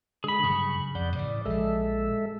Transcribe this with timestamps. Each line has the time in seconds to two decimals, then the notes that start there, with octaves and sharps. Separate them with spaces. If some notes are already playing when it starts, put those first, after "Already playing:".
0.24 D3 G#3 G#4 B5
0.44 G2 C#3 F#3 C#6
0.95 F2 D5 F#5 G6
1.16 A2 C#3 E3 D5
1.45 A#1 F3 G#3 A4 E5